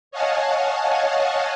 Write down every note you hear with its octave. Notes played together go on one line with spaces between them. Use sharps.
C#5 D#5 F5 F#5 G#5 A5